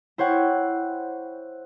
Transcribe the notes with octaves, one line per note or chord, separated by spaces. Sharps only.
E4 C5 C#5 F#5 G5